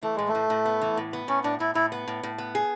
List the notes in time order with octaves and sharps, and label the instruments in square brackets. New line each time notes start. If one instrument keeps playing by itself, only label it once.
[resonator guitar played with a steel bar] E3 [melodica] A3
[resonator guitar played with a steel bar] A2 [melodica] G#3
[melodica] A3
[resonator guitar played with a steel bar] A2
A2
B3
E3
A2
B3
[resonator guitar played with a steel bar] A2 [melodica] C#4
[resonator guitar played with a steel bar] A2 [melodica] D4
[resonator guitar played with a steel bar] A2 [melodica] E4
[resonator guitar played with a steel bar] A2 [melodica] E4
[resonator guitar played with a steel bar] B3
A2
A2
B3
G#4